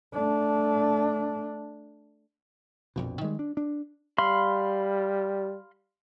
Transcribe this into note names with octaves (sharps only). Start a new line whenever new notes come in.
A3 D4
A#1 F2 B2
D#3 E3 G3 G#3
D4
D4
G3 F5 B5 C6